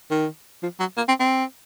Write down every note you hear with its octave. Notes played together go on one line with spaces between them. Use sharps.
D#3
F3
F#3
A#3
C4
C4